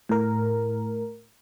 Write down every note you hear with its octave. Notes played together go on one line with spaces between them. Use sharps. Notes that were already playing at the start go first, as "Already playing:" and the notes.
A2 A#4